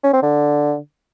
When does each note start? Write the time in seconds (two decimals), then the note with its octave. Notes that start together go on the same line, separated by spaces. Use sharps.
0.04 C#4
0.13 C4
0.22 D3